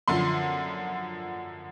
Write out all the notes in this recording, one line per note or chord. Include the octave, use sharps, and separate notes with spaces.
F#2 D3 F3 C6